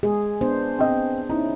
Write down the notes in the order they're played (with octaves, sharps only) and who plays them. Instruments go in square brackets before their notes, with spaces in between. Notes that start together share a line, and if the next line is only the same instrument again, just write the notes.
[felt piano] G#3 [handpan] G#4
[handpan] B3 D4 C5
[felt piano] C4 D#5
[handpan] C#4 E4 [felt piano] D#4